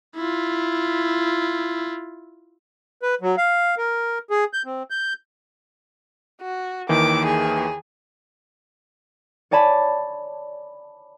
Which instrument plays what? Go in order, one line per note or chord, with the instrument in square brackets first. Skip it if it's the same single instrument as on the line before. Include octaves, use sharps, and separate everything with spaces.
[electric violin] E4 F4
[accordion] B4
F#3
F5
A#4
G#4
G6
C4
G6
[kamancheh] F#4
[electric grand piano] D#2 D#3 E3 [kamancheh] D6
[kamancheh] G#4
[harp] C#5 D5 G#5 A5 B5